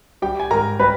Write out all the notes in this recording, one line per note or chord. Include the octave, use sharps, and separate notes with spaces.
G3 G4 G5
G#5
G#2 A#4 A#5
G3 B4 B5